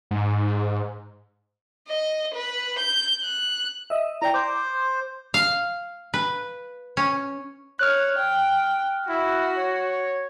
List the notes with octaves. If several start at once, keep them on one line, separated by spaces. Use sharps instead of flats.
G#2
D#5
B4
G6
F#6
D#5 E5
E4 D5 G5 A#5
C5 D6 G6
F5
B4
C#4
C#5 F6 F#6
G5
E4 F#4
C#5